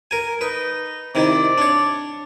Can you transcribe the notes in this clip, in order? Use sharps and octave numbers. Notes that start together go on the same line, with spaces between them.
A#4 G#5
D#4 B4
C3 D#3 E4 D5
D4 C#5